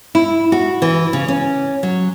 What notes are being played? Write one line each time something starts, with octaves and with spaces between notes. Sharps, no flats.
E4
F#4
E3
C#3
C#4
F#3